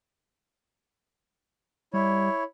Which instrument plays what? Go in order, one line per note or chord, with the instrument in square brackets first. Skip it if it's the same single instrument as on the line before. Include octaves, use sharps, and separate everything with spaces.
[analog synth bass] G3 [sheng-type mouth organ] E4 C#5